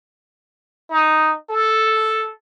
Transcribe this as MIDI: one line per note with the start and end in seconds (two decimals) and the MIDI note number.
0.90 1.35 63
1.50 2.31 69